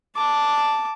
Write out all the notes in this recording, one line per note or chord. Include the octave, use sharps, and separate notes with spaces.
A5 D6